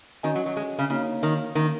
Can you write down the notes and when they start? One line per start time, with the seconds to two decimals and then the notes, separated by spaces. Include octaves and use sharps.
0.23 D#3 C#4 F#4 D#5 G#5
0.35 F#3
0.46 F#3
0.57 G#3
0.79 C#3
0.90 C#3 A#3 D#4 F#4 C#5
1.23 D#3
1.55 D#3 A#3 C#4 A#4